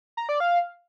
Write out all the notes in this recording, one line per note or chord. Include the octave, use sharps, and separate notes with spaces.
A#5
D5
F5